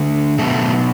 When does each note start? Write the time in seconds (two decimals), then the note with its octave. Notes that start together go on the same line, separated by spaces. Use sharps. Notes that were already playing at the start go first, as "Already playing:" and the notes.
Already playing: D3 A3
0.39 B2 F#3 A3 B3 A4